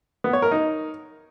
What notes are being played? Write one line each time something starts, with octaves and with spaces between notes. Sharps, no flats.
B3
C#5
A#4
D#4